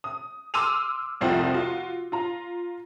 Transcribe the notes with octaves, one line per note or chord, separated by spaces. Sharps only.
D#6
C6 D6 E6 F6 D#7 F7
F1 C2 F3 G5
F4 F#4
F4 A#5